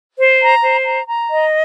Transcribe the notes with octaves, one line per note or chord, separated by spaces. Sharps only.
C5
A#5
C5
A#5
A#5
D#5